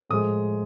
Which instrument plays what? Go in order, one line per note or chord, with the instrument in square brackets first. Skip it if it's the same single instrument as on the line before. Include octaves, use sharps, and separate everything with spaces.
[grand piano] A2 F3 G#3 D#6